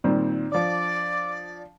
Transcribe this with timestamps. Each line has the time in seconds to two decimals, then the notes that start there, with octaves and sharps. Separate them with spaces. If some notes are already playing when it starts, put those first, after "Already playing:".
0.04 A#2 D#3 G3 C4
0.52 F3 D4 D5 D6